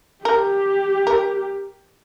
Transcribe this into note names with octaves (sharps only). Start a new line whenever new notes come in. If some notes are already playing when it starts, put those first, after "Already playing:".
G4 A#4
A#4